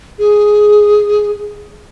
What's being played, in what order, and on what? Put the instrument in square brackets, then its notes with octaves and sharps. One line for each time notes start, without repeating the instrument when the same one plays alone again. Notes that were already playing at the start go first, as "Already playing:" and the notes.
[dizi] G#4